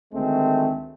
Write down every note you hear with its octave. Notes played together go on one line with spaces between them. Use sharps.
D2 D#3 G#3 A3 C4